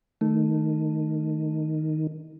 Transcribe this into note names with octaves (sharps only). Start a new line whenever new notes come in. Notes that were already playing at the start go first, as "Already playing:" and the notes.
D#3 A3